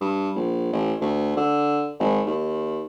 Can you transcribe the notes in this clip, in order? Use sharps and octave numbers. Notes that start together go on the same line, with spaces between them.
G2
A#1
A1
D2
D3
G#1
D#2